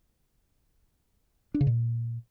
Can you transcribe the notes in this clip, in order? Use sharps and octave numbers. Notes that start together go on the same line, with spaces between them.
D4
C#3
A#2